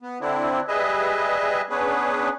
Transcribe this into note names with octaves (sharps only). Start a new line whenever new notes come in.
B3
D3 C4 D4 E4
G3 G#4 B4 D#5 E5
B3 C#4 D4 G#4 B4